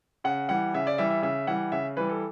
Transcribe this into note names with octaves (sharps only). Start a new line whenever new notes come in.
C#3 F#5
E3 G3 F#5
C#3 E5
D5
E3 G3 E5
E5
C#3 E5
E3 G3 F#5
C#3 E5
E3 G3 B4
A4